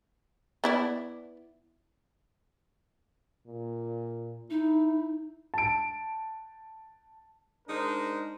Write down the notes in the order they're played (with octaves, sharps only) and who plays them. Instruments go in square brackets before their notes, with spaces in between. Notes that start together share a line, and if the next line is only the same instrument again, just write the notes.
[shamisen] B3 E4 D5
[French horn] A#2
[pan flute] D#4 [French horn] E4
[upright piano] A5 D7
[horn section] G#3 D4 D#4 A#4 C5